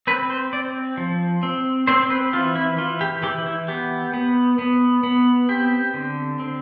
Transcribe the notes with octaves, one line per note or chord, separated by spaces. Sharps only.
C4 B4
C5
C4 D5
F3
C4
C4 C5
B4
E3 F4
E4
E3 F4
G4
E3 G4
E4
B3 G4
B3
B3
B3
C4 G4
D3
C4